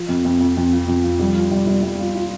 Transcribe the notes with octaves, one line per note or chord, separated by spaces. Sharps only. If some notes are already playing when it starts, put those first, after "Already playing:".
Already playing: F3
F2
F2
F2
F2
F3
F2
F3
G3
F4
G3
G3
G3
F4
F4